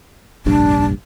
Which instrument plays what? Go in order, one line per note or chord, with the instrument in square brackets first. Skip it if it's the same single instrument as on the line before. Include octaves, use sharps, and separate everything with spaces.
[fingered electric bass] F1 A#1 G2 [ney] D4